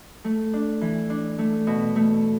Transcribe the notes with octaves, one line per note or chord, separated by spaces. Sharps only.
A3
D4
E3
D4
A3
B2
A3